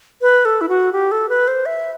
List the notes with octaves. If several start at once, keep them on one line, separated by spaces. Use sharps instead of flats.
B4
A4
E4
F#4
G4
A4
B4
C5
E5